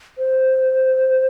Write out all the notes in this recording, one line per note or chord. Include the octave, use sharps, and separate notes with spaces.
C5